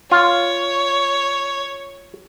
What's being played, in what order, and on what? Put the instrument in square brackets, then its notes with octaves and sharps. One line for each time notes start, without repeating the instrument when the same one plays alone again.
[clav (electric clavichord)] F4 [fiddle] C#5